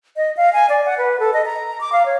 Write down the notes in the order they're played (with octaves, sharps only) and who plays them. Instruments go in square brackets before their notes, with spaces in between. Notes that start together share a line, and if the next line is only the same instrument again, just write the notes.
[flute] D#5
F5
G#5
D5
F#5
B4
A4
D#5
A#5
D6
F5
C#5